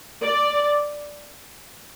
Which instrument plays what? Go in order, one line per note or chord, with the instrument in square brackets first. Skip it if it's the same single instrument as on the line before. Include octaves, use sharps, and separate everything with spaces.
[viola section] D5